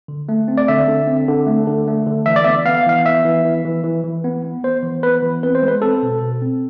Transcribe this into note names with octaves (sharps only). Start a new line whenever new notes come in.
D3
A3
C4
D5
D3 E5
D3
C4
D3
A3
D3
A3
D3
E3 E5
D5
B3 E5
B3 F5
E3 F5
B3 E5
E3
E3
E3
E3
E3
B3
B3
B3 C5
E3
B3 B4
E3
C4 B4
C5
G#3
B4
C4 A4
B2
B2
C4